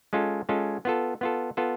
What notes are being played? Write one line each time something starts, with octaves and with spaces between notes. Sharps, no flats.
G#3 C#4 F4 A4
G#3 C#4 F4 A4
B3 F4 A4
B3 F4 A4
B3 F4 A4